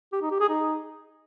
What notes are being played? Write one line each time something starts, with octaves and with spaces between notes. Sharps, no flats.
G4
D#4
G4
G#4
D#4